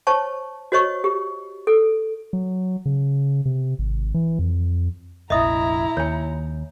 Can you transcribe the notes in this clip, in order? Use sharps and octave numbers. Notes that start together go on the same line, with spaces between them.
C5 C#5 A5 C#6
F#4 C5 C#5 D#5 C#6
G4
A4
F#3
C#3
C3
G#1
E3
F2
F1 A#1 E4 D#5 E5 A#5 D#6
D#2 C#5 G#5